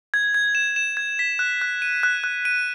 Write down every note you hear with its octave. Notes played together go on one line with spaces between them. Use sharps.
G#6
G#6
E7
E7
G#6
B6
F#6
F#6
D#7
F#6
F#6
D#7